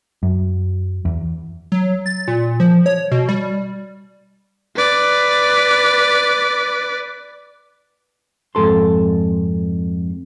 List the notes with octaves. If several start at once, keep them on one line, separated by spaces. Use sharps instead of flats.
F#2
E2
F#3
A6
A#2
F3
C#5
B2
G3
B4 D5
F2 G#2 A4 C6